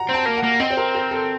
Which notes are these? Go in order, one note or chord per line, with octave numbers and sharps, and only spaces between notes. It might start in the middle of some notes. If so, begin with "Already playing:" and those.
Already playing: F#5 A#5
C4
A5
A#3
F#5
A#3
C4 D#5
C5
A#4
A#4
A4